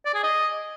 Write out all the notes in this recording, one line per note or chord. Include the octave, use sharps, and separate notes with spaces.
D5
G#4
D#5